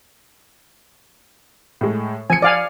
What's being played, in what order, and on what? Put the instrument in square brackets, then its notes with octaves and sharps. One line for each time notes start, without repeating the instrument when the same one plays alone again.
[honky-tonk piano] A2 G#3
[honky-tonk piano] F3 C#7 [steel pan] G#5
[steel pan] D5 F5 G#5